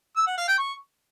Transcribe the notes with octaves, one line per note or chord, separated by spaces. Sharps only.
E6
F#5
F5
G5
C#6